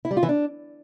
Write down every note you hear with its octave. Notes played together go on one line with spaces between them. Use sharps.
E4
G3
F4
E3
D4